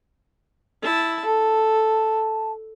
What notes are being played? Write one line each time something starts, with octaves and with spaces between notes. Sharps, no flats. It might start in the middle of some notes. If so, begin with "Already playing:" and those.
E4 A5
A4 A5